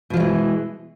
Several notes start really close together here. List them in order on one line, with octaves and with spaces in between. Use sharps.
B2 F3 G#3 E3